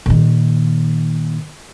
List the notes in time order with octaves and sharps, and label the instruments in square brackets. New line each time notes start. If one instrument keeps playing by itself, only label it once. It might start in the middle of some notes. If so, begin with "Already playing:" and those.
[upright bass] A#2 D#3